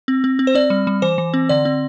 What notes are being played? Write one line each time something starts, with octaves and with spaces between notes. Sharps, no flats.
C4
C4
C4
C5
C4 D5
G3
G3
E3 C5
E3
C4
D3 D5
C4